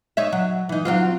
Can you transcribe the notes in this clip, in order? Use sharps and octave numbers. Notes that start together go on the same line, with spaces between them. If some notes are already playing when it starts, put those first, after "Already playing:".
D#4 C#5 E5
F#3
E3 D#4
F#3 C4 F4